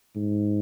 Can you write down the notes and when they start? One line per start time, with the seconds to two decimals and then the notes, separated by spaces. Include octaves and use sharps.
0.16 G#2